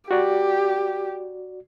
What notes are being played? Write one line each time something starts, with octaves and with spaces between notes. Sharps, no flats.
F#4 G4 D5